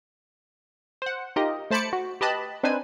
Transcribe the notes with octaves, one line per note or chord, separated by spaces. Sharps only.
C5 F#5
D#4 F4 G4 A#4 D#5
A3 C5 A5 B5 D6 C#7
F#4
G4 B4 D#5 A5 B5
C4 D4 D#4 B4 C5 G#5